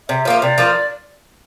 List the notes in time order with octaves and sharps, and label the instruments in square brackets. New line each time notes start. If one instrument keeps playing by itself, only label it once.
[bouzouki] C3 [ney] E5
[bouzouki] F3 A#3 F4
[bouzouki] C3 [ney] D5
[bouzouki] F3 A#3 F4